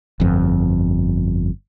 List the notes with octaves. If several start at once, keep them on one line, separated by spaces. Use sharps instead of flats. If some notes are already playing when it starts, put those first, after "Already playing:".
G1 F2